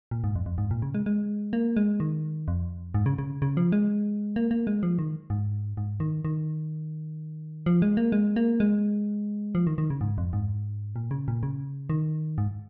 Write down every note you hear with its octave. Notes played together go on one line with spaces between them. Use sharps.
A#2
G#2
F2
F2
G#2
A#2
C#3
G#3
G#3
A#3
G#3
D#3
F2
G#2
C#3
C#3
C#3
F3
G#3
A#3
A#3
G#3
F3
D#3
G#2
G#2
D#3
D#3
F3
G#3
A#3
G#3
A#3
G#3
F3
D#3
D#3
C#3
G#2
F2
G#2
A#2
C#3
A#2
C#3
D#3
G#2